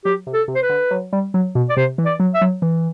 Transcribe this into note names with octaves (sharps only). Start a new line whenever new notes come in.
F#3 G4
C3
A4
C3
C5
B4
D3
F#3
G3
F#3
B2
D5
C3 C5
E3
D5
F#3
E5
F#3
E3